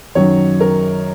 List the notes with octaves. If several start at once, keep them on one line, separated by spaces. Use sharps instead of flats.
F#2 D#3 F#3 C#5
A#4